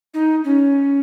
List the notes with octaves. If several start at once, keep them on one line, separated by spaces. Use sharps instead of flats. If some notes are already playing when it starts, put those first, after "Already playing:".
D#4
C#4